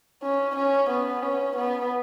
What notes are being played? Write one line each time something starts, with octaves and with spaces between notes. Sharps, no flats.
C#4
C#4
B3
C#4
B3